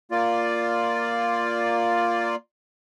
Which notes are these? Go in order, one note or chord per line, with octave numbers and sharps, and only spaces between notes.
A#3 F4 D5